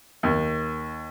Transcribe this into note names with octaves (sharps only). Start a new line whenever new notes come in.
D#2